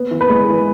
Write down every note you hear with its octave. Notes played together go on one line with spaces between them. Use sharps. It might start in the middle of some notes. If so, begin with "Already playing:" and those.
Already playing: B3
E3
B4
G#3
E3